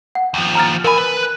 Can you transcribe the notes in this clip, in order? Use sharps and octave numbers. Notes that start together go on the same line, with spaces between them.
F#5
D#2 F3
A#5 F6 A6
F3 A#4 G#5 B5
B4
F#6